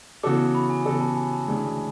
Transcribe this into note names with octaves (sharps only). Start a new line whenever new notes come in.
C#3 E3 B3 F#4 A4 D6
B5
G#5
C#3 E3 B3 F#4 A4 G#5
A5
G#5
A5
D2 C#3 E3 G#3 D4